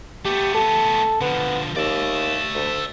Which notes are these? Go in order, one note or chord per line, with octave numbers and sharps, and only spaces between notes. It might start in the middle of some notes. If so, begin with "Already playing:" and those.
A3 B3 G4
A4
D3 F3 B3
D#2 D5 E5
D2